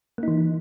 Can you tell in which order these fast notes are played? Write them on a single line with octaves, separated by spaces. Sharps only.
A#3 D#4 E3